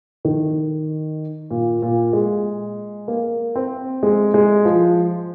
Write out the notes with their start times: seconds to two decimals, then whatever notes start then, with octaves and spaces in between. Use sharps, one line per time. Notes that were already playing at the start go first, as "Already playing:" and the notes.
0.25 D#3
1.51 A#2
1.82 A#2
2.13 G#3
3.08 A#3
3.56 C4
4.03 G#3
4.34 G#3
4.65 F3